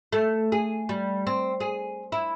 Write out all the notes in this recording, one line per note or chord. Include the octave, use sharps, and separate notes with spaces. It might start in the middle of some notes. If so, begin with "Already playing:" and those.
A3
G#4
G3
C4
G#4
E4